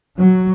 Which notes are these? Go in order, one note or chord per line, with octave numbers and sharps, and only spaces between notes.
F#3